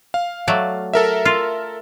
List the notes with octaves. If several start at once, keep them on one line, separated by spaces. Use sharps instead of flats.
F5
F#3 A3 D5
A4 A#4 E5
F4